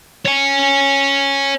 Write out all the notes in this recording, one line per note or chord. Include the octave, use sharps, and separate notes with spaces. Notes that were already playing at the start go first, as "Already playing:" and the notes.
C#5 G#5